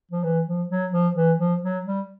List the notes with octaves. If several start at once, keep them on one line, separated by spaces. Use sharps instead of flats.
F3
E3
F3
F#3
F3
E3
F3
F#3
G3